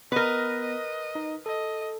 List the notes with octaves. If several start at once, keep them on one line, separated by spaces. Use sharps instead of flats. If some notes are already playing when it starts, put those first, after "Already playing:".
B3 A#4 B4 D#5
D#5
D#4
A4 D#5